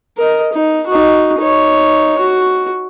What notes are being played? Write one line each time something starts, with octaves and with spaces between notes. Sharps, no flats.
A#4 D#5
D#4
D#4 F#4
D#4 C#5
F#4